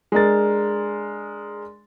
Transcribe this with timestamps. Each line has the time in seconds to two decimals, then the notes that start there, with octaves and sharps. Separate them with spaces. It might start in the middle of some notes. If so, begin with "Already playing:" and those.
0.12 G#3 D4 A#4 A6